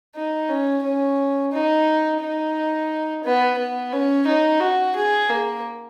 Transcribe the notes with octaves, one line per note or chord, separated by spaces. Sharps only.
D#4
C#4
C#4
D#4
D#4
B3
B3
C#4
D#4
F#4
G#4
A#3